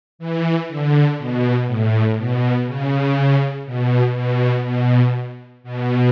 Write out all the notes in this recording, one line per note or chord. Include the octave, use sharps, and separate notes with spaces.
E3
D3
B2
A2
B2
C#3
B2
B2
B2
B2